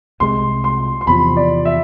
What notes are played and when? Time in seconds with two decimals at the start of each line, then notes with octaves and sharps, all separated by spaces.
0.20 C2 C3 G#3 C6
0.64 C6
1.01 C6
1.07 E2 C3 F3 B5
1.37 D5
1.65 E5